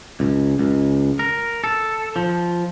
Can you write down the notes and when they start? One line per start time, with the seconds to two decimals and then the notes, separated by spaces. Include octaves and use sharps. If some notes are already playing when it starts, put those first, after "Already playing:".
0.20 C#2
0.59 C#2
1.19 A#4
1.64 A4
2.16 F3